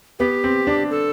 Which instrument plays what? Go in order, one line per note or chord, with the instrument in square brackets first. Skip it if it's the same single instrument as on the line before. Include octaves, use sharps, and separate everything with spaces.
[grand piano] B3 [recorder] G4
[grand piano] C4
D4
[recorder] A4